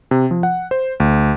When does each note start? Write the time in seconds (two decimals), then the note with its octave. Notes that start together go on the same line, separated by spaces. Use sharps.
0.11 C3
0.31 F3
0.43 F#5
0.71 C5
1.00 D2